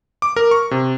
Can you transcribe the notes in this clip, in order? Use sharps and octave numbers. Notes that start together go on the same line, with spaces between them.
D6
A#4
C#6
C3